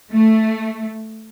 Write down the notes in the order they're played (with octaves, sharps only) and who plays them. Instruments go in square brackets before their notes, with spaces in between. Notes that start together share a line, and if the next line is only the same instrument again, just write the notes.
[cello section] A3